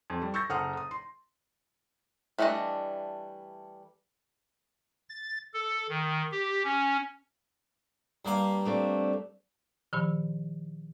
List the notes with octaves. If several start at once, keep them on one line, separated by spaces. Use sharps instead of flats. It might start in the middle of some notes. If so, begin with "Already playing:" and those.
F2
G3
C#6 E6 G6 A6 A#6
F#1 A4 F#5 C6 D#6 F6
D#6
C6
E3 G3 A3 D4 D#5
A6
A4
D#3
G4
C#4
G2 A#3 F5
A3 C4 D4
A#2 D#3 F3